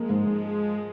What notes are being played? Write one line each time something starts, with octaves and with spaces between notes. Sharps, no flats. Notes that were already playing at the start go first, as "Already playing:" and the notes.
Already playing: F3 G#3 A#3
G#2
G#2